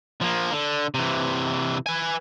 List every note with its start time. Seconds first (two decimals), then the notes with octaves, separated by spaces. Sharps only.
0.21 F3 A#3
0.52 D3
0.94 C3 E3
1.87 B4 G#5